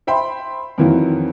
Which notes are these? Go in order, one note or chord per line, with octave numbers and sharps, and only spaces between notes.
C5 E5 G5 B5 C6
F2 D#3 E3 F#3 A#3 E4